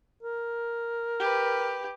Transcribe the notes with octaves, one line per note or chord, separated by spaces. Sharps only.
A#4
G4 B4